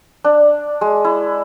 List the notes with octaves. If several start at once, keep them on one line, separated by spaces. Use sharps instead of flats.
D4
G#3
E4